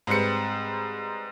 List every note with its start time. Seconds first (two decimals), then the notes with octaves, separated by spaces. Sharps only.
0.07 G#2 G3 C4 B4 C#7